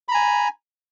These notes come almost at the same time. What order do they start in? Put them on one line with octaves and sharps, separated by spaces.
B5 A#5 G#5